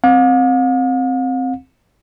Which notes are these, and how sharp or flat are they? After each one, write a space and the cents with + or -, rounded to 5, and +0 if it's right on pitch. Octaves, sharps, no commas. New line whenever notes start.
C4 +0 F5 +45